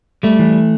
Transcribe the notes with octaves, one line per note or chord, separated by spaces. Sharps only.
G3 A3
E3